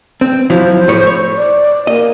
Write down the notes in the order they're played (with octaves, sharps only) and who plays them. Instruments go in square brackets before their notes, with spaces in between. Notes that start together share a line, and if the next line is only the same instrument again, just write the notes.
[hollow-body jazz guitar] C4
[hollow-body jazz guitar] F3 F#3 E4 [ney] C5
[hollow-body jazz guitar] A2 C#5
C#5
[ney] D5
[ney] A#3 [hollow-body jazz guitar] D#5